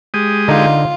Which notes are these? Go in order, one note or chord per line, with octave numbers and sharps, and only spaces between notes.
G#3 G4 D#6
D3 D#4 F4